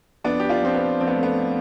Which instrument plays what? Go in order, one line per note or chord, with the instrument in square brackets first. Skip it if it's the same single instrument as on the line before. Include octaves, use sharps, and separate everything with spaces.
[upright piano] F2 B3 D4
G4
D4 F4
F3 C4
B3
F2 C4
B3
A3
B3